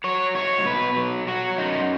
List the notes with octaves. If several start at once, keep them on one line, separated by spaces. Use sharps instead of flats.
F#3 C#5
G#2 C#5
B2 B4
F#3
F#3 F#4
F#2 D#4